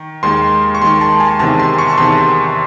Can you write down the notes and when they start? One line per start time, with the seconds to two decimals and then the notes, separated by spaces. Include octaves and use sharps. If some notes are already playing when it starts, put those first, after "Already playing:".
Already playing: D#3
0.23 D#2 D#3 G#3 C6
0.75 C#6
0.82 D#2 D#3 G#3 C6
1.01 A5
1.20 G#5
1.39 E2 C3 D#3 A5
1.59 C6
1.78 C#6
1.90 A5
1.98 E2 C3 D#3 C6